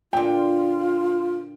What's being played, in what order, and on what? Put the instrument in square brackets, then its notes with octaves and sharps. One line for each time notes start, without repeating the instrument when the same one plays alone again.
[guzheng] A#2 D3 [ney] F4 [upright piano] G5